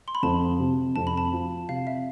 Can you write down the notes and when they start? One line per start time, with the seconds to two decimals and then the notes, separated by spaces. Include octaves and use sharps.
0.08 C6
0.15 B5
0.23 F2 A5
0.60 C3
0.96 F2 A5
1.07 B5
1.17 A5
1.32 F3
1.69 C3 F5
1.87 E5